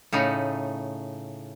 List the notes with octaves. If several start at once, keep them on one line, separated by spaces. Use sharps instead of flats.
A2 C#3 A3 D#4